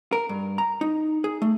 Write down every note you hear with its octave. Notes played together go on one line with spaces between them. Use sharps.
A#4
G2
A#5
D#4
G#4
A3